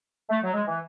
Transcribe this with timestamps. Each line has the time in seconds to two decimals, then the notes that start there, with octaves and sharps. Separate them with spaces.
0.30 A3
0.43 F#3
0.54 G#3
0.67 E3